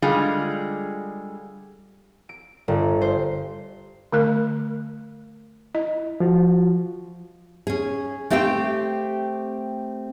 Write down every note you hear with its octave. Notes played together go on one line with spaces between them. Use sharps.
D3 G3 G#3 F4 G#4
D7
G1
C5
D3 A3 A#4
E4 D#5
F3 F4 F#4
C#4 G#4
A3 C4 G4 F5 G5